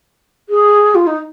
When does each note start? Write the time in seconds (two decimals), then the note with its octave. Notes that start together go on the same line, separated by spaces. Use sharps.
0.49 G#4
0.95 F4
1.07 D#4